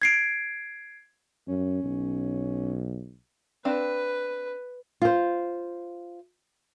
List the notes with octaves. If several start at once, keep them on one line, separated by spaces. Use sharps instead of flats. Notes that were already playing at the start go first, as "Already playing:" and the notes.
G#6 C7 D7
F#2 C#4
B1
C4 D4 B4 F5
F4 C5